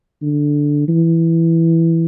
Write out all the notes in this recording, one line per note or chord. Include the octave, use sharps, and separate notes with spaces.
D3
E3